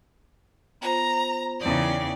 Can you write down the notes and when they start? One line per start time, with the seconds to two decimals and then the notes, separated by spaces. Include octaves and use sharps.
0.81 B3 F4 C5 A#5
1.61 E2 C#3 D#4 D5 G5